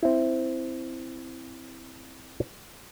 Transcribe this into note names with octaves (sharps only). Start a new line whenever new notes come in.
C4 E4